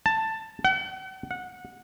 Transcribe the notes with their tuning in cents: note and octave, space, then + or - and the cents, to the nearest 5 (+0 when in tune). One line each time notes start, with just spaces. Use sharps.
A5 +10
F#5 +40
F#5 -20